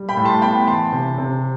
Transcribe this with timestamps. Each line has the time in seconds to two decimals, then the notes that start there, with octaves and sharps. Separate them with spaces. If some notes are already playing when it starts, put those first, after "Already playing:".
Already playing: G3
0.09 G5 B5
0.17 A2
0.25 A5 C6
0.42 B3 G5 B5
0.67 E3 A5 C6
0.92 C3
1.18 C3